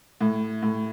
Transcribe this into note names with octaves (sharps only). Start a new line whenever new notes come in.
A2
A2